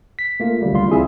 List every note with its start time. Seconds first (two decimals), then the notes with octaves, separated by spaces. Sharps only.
0.19 B6
0.40 A3 A#3 F4
0.61 D3 F#3 G3 A3
0.72 C#2 D#3 G3 F4 C6
0.89 C4 E4 G#4 E5